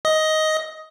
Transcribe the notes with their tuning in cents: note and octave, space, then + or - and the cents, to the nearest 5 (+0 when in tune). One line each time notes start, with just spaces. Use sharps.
D#5 +10